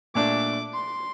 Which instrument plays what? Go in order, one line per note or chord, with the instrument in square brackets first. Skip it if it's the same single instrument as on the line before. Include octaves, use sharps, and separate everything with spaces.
[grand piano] A#2 A3 D4 [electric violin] D6
[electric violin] C6